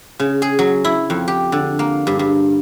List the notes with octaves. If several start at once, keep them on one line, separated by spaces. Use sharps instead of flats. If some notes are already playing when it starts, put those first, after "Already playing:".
C#3
G#4
F#3
E4
F2
G4
D3
A#3
G2
G2